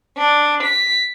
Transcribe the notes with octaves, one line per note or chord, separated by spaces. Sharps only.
D4
B6